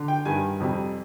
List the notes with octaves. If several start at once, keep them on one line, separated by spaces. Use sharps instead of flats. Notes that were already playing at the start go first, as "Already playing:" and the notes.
Already playing: D3
G5
G2 D#3 G3 G#5
F2 C3 G3